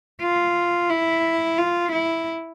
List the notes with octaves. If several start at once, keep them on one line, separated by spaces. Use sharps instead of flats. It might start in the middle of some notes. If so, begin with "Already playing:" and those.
F4
E4
F4
E4